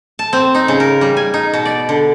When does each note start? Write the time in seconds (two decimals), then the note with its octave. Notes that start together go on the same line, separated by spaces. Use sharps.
0.19 A5
0.33 C4
0.55 D#4
0.68 C#3
0.80 A#4
1.01 G3
1.17 G#5
1.34 D#4
1.54 B2
1.65 D5
1.89 D3